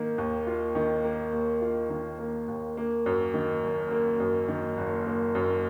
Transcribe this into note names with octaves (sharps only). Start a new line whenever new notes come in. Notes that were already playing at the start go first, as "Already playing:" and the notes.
Already playing: D#3 A#3
D#2
F4
D#3
A#3
D#2
F4
D#3
A#3
D#2
A#3
F#2
D#3
F#1
A#3
F#2
D#3
F#1
A#3
F#2